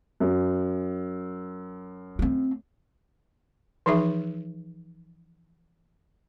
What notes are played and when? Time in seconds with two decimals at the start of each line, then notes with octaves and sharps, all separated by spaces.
0.20 F#2
2.19 A3 C4
3.86 E3 F3 D#4 G#4 E5